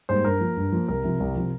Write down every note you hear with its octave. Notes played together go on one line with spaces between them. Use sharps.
G#2 G3 A#3 C5
G2 A#4
F3 A#3
G2
F3 A#3
C2 A#4
C3 F3
C2
C3 F3